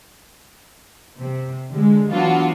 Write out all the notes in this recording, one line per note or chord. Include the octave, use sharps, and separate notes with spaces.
C3
D3 G#3
E3 F#3 B3 D4 F4 F#4